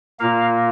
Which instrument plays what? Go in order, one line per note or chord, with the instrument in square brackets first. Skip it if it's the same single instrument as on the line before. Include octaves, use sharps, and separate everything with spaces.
[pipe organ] A#2 A#3 F5